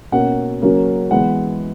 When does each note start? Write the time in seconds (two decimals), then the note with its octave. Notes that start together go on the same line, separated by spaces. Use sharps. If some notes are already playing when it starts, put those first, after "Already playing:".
0.12 B2 A#3 C#4 F#5
0.62 C#3 F#3 A#3 C#4
1.11 E3 G#3 B3 F#5